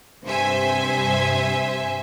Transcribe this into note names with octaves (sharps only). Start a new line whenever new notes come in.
G2 C3 C5 E5 G#5